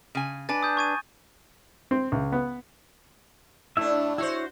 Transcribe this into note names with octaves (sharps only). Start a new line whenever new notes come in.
C#3 G#5
D4 B4 G#5 A6
D#6 G6
C#6 G#6 D#7
C4
C#2
B3
A2 A3 D4 E4 E5
E4 F#4 C5 C#5